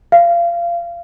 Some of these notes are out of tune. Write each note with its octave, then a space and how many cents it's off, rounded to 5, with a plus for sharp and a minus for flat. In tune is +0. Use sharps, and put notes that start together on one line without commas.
F5 -30